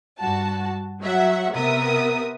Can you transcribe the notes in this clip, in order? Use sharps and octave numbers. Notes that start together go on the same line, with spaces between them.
G2 F#4 A5
F#3 E5 F#5
C3 B3 A#4 E5 D#6